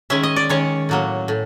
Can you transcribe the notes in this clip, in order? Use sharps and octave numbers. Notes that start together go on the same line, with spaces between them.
D#3 G#3 C#4 E5
D#5
D5
D#3 G#3 C#4 C#5
A2 F#3 A#3
A2